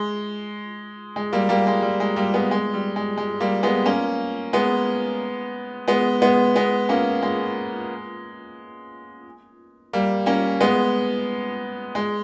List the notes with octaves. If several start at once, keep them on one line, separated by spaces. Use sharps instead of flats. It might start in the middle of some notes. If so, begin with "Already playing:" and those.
Already playing: G#3
G#3
G3 A#3
G3 A#3
G#3
G3
G#3
G3 A#3
G#3 B3
G#3
G3
G#3
G#3
G3 A#3
G#3 B3
A#3 C#4
G#3 B3
G#3 B3
G#3 B3
G#3 B3
A#3 C#4
G#3
G3 A#3
A#3 C#4
G#3 B3
G#3